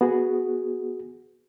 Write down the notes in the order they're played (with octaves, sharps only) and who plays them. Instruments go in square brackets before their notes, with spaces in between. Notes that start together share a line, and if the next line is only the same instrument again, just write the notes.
[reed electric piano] B3 F#4 G#4